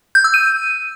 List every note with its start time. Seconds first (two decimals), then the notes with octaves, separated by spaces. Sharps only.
0.15 G6
0.24 E6
0.34 D#7